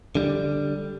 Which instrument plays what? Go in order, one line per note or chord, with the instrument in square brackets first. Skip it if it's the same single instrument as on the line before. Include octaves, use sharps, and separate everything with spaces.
[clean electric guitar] D3 G3